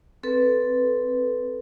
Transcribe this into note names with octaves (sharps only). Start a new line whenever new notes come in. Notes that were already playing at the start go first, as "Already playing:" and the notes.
C4 A4 B4